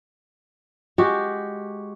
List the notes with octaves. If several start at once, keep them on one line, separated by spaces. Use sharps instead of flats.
G#3 F#4 G4